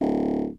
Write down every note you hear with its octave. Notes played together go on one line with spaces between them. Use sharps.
D1